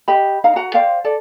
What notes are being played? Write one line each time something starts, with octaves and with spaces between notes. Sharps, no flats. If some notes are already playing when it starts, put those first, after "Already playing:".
G4 D#5 B5
D#4 F5 A#5
F#4 F#5 A#5
C5 D5 F5 G5
A4 D5